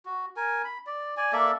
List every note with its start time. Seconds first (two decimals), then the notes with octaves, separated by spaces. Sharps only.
0.05 F#4
0.36 A#4 G#5
0.65 B5
0.86 D5
1.17 D5 G#5
1.33 A#3 A4 D5 E5